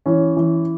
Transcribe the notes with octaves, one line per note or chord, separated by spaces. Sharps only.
E3 C#4
E3